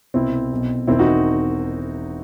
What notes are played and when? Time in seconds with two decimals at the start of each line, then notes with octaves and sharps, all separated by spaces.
0.14 C2 B2 C4 E4
0.52 B1 B2
0.87 E1 E2 D#3 C4 E4
0.99 D#4 F#4